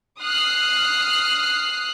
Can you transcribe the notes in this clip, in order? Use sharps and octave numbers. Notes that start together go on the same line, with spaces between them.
D#6 F6 F#6 C7